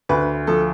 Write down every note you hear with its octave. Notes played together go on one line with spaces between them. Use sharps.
D2 B4
F3 A4